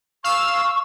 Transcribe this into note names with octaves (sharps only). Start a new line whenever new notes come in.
F5 C#6 E6